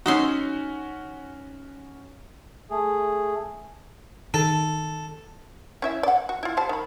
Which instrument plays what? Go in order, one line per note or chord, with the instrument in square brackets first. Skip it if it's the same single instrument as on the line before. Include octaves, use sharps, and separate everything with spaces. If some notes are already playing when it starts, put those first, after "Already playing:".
[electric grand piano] C#4 F#4 [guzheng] D#4 E5 C6
[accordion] A3 G#4
[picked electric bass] D#3 [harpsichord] A4
[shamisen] C#4 E4 E5
D5 F#5
F#4
E4 F4
G3 C5 A5
D#3 B5